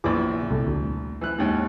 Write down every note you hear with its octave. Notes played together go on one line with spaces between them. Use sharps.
A#1 E2 E3 E4 G#4 D6
C2 A3
D2
E3 F#6
D#2 G#2